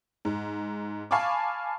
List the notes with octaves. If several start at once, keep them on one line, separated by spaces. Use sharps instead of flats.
G#2
F5 G#5 A5 B5 C#6 D6